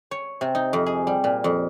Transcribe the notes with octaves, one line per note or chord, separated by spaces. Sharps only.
C#5
C3
D#4
F2
G#4
G3
A#2
F2